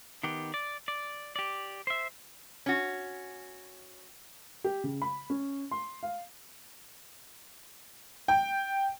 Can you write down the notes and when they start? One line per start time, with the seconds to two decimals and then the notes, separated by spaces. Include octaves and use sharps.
0.23 D#3 B3 G4
0.54 D5
0.88 D5
1.36 G4 D5
1.87 C5 E5
2.66 C#4 F#4
4.64 G4
4.84 C#3
5.02 B5
5.30 C#4
5.71 C6
6.03 F5
8.28 G5